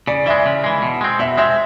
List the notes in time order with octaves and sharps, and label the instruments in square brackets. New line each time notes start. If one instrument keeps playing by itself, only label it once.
[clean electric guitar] C#3 [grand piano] D5
[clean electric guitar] E3 G#3 [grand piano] E5
[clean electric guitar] C#3
E3 G#3
B2
G#3 C4
[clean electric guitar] B2 [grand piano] E5
[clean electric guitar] G#3 C4 [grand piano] E5